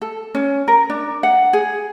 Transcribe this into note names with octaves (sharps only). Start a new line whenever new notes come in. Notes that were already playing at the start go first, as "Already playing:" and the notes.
A4
C#4
A#4
D4
F#5
G#4